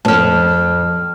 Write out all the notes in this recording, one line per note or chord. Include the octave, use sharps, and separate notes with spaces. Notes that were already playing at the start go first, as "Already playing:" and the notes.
F2 G#2 A5 F6